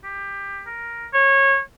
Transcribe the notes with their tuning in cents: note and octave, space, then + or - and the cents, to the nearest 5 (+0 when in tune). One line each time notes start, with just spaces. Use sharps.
G4 +20
A#4 +5
C#5 -25